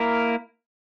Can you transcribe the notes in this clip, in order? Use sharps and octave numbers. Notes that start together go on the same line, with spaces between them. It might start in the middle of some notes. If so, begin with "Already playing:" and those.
Already playing: A#3 E4 A#4